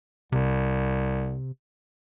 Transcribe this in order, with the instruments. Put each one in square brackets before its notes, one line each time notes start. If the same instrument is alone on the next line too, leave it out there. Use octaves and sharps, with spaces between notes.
[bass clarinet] C2 [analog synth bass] C3